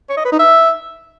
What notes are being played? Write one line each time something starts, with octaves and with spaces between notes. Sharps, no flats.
C#5
D#5
B4
D#4
E5